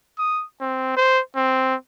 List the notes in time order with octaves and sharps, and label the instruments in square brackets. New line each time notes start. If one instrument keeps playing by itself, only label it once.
[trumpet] D#6
C4
C5
C4